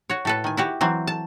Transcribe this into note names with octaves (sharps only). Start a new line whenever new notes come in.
F#4 C#5
A2 A4 B4
D#3 G#5
E4 F#4 G4
E3 F#3 C4
A5